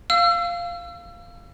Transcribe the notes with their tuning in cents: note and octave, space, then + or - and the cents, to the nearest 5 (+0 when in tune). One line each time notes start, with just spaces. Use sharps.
F5 -5 E6 +30